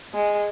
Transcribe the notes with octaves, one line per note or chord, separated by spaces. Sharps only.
G#3